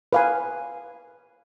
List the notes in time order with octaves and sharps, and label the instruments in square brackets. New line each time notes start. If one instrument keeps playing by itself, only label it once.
[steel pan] B4 F5 G#5